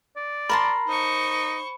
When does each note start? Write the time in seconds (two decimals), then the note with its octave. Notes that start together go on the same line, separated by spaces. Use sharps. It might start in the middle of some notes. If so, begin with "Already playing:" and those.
0.16 D5
0.50 A#4 A5 B5 C6
0.88 D#4 C5 C#6